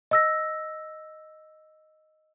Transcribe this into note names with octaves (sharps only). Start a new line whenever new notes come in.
D#5 E6 A#6